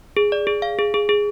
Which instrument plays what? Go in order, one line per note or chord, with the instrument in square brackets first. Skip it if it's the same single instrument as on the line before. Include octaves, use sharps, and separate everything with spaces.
[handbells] G#4
D5
G#4
F5
G#4
G#4
G#4